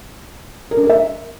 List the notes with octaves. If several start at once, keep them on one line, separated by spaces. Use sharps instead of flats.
A#4
D4
A#4
E5